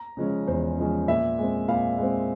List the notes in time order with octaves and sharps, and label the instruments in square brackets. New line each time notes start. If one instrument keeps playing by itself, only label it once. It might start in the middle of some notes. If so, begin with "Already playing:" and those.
Already playing: [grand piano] A#5
C#3 F3 G#3 C#4
E2 C5
C#3 F3 G#3 C#4
A#2 E5
G#3 C4
A#2 F5
G#3 C4